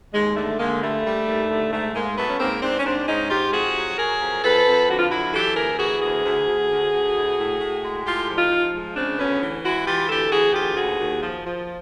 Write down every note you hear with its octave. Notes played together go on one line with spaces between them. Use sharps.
D#2 G#3
D3 A3
D3 G#3 A#3
G3 A3
G3
D#2
D3
G#2 A3
G#2 G#3 A#3
F#3 A3 B3
C#4
G#2 A#3 C4
G#2 C4 D4
C#4
G#2 C4 D4
G#2 C#4 D#4
G#2 F4 G4
F2 F#4 G#4
F#3
F#3 G#4 A#4
F2
F2 A4 B4
F2
D3 F#4
F4
F#3 E4 F#4
E3 G4 A4
D2 G#4 A#4
E3 F#4 G#4
D2 F#4 G#4
D2
D2
D2
D2
A2
A2
A2
G#3
A2 F4 G4
F3
D#4 F4
F3
G#3
C#3 C4 D4
D2 B3 C#4
E3
G#3 E4 F#4
E3 F4 G4
D2 G4 A4
E3 F#4 G#4
D2 F4 G4
D#2 F#4 G#4
D#2
F3
F3